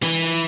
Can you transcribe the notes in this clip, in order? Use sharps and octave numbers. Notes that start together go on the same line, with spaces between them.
E3